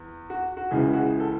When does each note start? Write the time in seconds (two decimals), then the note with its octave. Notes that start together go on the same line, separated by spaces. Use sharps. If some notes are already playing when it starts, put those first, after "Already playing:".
Already playing: E2
0.30 F#4
0.57 F#4
0.71 C#2 C#3 E3 G#4
0.93 F#4
0.99 G#4
1.20 A4